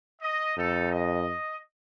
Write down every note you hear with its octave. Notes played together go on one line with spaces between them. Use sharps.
D#5
F2 D#4 A4
D#5